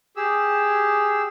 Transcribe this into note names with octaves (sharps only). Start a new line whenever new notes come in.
G4 G#4 E6